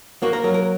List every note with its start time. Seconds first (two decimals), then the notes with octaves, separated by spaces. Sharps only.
0.22 A#3 F#4
0.33 A#4
0.44 F#3 A#4
0.54 A#4